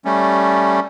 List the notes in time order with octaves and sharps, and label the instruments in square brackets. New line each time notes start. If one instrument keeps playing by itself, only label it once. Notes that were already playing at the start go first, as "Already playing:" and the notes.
[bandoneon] G3 A3 C#4